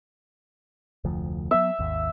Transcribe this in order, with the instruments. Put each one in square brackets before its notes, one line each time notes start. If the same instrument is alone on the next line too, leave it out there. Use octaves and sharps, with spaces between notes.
[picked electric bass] F1 D2 F3
[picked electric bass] F#3 B3 [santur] E5
[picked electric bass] G#1 D#2